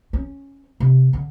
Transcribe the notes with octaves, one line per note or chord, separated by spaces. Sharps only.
C#4
C3
D3